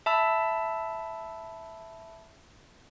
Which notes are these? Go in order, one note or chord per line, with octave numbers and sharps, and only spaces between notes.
E5 A5 B5 E6